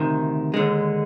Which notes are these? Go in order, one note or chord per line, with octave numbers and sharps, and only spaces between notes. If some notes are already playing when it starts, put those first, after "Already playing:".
Already playing: D2 C3 D#3
D#2 D3 G#3